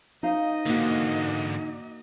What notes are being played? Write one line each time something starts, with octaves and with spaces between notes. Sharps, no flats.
D#4 C5 D#5 F5
G#2 D3 A#3 F#4